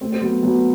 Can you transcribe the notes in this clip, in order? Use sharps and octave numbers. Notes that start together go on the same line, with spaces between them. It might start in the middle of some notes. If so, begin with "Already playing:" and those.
A3 C4
C4
F#3 B3
F#3 B3